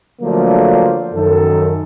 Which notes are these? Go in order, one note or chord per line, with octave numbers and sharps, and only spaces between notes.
D3 F3 F#3 A3 A#3 D4
F#2 D#3 A4